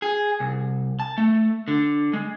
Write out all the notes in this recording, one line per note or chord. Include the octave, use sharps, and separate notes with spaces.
G#4
C2
A5
A3
D3
G#3